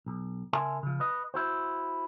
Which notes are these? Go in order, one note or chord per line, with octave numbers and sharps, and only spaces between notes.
B1
C#3 A#4 E5 G#5 A5 C6
C#3 F3
B4 D#5
E4 F#4 C5